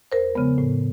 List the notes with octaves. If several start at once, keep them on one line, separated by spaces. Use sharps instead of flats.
E2 A#4 C5
C#3 F3 G#3 B3
A2